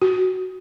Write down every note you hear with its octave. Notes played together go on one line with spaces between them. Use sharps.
F#4